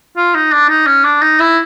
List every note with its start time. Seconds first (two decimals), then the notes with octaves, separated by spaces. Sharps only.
0.17 F4
0.35 D#4
0.52 D4
0.69 D#4
0.86 C#4
1.04 D4
1.22 D#4
1.40 E4